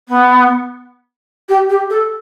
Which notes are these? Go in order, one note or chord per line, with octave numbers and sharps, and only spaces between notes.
B3
G4
G4
A4